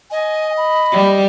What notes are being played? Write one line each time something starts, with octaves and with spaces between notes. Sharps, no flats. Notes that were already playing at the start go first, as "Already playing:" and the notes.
D#5 G#5
B5
G3